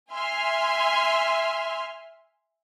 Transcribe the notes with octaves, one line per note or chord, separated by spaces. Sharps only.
E5 G#5 C6 F6